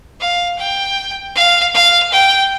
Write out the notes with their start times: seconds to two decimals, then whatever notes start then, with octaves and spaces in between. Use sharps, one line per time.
0.20 F5
0.58 G5
1.35 F5
1.74 F5
2.12 G5